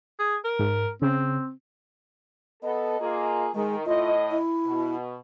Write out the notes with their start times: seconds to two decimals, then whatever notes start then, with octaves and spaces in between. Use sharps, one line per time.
0.19 G#4
0.44 A#4
0.59 G#2
1.02 C#3 C4
2.63 B3 A4 D#5
3.00 A#3 F4 G#4
3.54 D#3 G#3
3.86 A2 F4 D#5
4.31 E4
4.66 B2